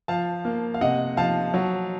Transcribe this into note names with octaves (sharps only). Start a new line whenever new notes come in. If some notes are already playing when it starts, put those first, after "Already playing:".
F3 F5 A5
A#3
F5
C3 D#5 F#5
F3 F5 A5
F#3